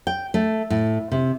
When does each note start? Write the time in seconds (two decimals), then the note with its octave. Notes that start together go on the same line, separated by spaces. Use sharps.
0.07 G5
0.34 A3
0.70 A2
1.12 C3